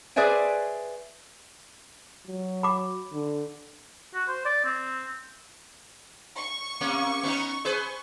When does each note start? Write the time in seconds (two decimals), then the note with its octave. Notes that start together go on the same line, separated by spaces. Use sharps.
0.16 G#4 B4 C5 D5 E5 G#5
2.27 F#3
2.63 B5 D6
3.13 D3
4.14 F#4
4.28 C5
4.45 D5
4.64 C4
6.38 C#6
6.81 C3 A#3 C#4
7.23 B3 C#4 D#4
7.65 G#4 B4 C5